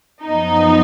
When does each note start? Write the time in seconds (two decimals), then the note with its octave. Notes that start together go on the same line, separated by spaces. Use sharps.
0.24 F#2 F3 B3 D#4